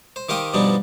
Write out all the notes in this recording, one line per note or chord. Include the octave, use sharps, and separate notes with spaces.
C5
D#3 G4 C5 F5 G5 D#6
G2 B2 F3 G3 D4 D#4